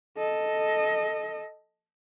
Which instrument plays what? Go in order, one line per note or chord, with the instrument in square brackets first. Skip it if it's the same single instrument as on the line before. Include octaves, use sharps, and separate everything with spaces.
[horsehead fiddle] A4 D#5